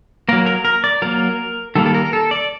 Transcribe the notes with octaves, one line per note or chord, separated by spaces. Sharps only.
F#3 A#3 A#4
A#4
A#4
D5
F#3 A#3 A#4
D#3 G3 A#3 A4
A4
A#4
A4
D5